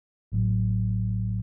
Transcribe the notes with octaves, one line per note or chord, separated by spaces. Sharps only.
A1 A2 F#3